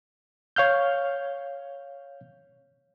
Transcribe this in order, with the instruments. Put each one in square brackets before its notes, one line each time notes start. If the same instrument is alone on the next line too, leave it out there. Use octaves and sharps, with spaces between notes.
[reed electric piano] C#5 F5 F6 G6